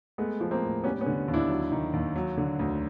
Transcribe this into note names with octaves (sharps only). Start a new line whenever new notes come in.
G#3 A3 B3
F3
A#3 C4
A2
G3 B3 C#4
B3 C#4
D3
D#2
D4 E4
F#3
D#3
D#2
F#3
D3
D2